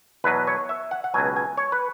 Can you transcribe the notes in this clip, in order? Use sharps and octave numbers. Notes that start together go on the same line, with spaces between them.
E2 B2 F#3 B4
C#5
E5
F#5
F#5
C#2 B2 F#3 G#5
G#5
C#5
B4